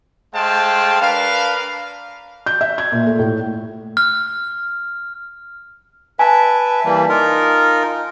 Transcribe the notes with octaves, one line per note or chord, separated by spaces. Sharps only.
G#3 A3 C5 F5 G5 A5
D4 A#4 B4 F5
G6
E5
G#6
A#2
A3
A2
F6
B4 E5 G#5 A5
E3 G3 A#3
D#4 F4 A#4